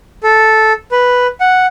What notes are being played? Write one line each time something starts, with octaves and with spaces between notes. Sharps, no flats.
A4
B4
F#5